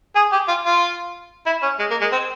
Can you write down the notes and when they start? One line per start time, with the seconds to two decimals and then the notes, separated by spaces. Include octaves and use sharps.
0.16 G#4
0.32 G4
0.48 F4
0.65 F4
1.46 E4
1.62 C#4
1.79 G#3
1.90 A#3
2.01 G#3
2.12 C4